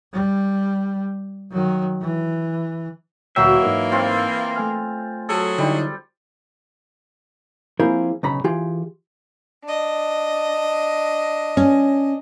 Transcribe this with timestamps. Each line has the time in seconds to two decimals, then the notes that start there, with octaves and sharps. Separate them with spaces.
0.13 G3
1.51 D#3 F#3
2.01 E3
3.36 D2 A#2 E3 F#3 A#3 E5 G5
3.63 G#2 D#4 A#4
3.92 C4 F4
4.56 A3 G#5 F6
5.29 F#3 G#4 A4
5.58 D3 G3 D#4 E4
7.80 F3 A#3 C4 E4 G#4 A#4
8.23 B1 C#3 A#5 B5
8.44 E3 F4 G4 G#4
9.63 D4 D#5
11.57 C#4